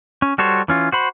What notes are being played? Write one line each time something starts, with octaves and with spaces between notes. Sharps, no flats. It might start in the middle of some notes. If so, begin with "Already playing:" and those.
C#4
G3 F#4 A4 C5 C#5
E3 C#4 F4
F#4 C5 B5